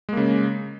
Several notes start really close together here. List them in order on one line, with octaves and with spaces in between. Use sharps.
G#3 A#3 C#3